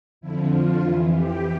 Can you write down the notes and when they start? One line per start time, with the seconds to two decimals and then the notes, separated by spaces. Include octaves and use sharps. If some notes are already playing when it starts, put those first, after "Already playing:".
0.21 F2 D3 F3 E4
0.51 F4
0.82 F2 E3 E4
1.13 G4